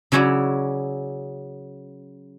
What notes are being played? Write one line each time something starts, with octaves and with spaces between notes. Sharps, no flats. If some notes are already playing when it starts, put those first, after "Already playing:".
C#3 F#3 C#4 E4 F#4 D5